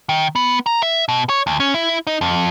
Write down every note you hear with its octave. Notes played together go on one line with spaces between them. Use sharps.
D#3
B3
A#5
E5
B2
C#5
D2
C#4
E4
D#4
F2